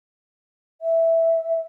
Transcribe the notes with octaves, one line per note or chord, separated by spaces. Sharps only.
E5